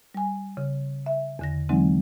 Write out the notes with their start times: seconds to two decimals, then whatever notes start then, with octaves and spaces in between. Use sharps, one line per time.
0.15 G3 G#5
0.57 C#3
1.06 E5
1.39 E2 D3 A#6
1.69 D3 E3 F#3 G#3 C4 D#4